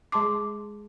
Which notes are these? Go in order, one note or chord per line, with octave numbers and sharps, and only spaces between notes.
G#3 G#4 A5 C6 D6